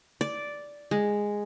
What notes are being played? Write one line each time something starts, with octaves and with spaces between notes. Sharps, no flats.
D5
G#3